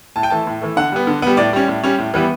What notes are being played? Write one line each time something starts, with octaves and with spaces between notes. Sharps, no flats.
A2 A5
G5
E3 A3 A5
A2
E3 A3
D3 F#5
G3 B3
D3
G3 B3
A2 D5
G3 C#4
A2
G3 C#4
A2
E3 G3 B3